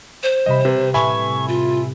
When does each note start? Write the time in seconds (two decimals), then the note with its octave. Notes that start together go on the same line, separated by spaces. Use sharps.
0.23 C5
0.46 C3 G3 D#5 B5
0.65 C3 B4
0.94 A2 C3 E5 G#5 B5 C#6
1.48 F4